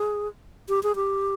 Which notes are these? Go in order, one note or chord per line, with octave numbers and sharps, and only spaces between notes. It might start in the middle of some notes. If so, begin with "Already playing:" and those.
Already playing: G#4
G4
G#4
G4